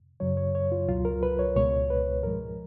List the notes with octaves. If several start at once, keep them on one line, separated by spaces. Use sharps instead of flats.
F#2 C#3 F#3 C#5
C#5
C#5
F4
C#2 B2 F#3 F4
A#4
B4
C#5
C#2 B2 G#3 C#5
B4
G#2 F3 G#3 A#4